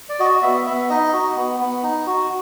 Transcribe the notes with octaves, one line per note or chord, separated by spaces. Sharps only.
D5
F#4 D#5
B3 E5
B3 E5
D#4 D#5
F#4
B3
B3
D#4
F#4